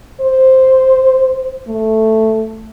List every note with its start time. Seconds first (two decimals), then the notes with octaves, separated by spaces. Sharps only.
0.21 C5
1.68 A3